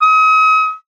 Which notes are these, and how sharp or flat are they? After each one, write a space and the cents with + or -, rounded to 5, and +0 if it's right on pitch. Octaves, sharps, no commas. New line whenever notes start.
D#6 +40